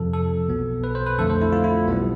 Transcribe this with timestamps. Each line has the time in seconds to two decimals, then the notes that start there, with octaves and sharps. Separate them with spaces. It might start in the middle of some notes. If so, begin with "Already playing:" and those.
Already playing: F2 C3 F3 A4
0.13 A4
0.49 B1 B2 B3
0.84 B4
0.95 C5
1.07 B4
1.18 F2 D3 A3 A4
1.30 C5
1.42 E4
1.52 F4
1.64 E4
1.87 B1 B2 G3 B3